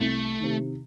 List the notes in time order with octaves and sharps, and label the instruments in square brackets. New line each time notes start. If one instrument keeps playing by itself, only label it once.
[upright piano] C2 [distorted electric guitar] A3
[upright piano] C3 D#3